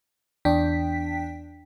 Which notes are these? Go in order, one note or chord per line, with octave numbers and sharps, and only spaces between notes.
E2 D4 G5 B6